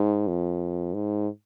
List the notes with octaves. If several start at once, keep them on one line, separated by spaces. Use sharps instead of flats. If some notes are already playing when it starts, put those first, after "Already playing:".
Already playing: G#2
F2
G#2